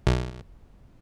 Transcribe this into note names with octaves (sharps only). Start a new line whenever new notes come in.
B1